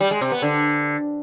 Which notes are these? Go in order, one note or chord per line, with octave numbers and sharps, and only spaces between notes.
G3
G#3
C3
B3
D3